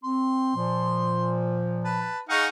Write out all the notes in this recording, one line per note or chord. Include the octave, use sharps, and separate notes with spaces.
C4 C6
A#2 F3
B4 A5
D#4 G#4 F5 F#5 G#5 C#6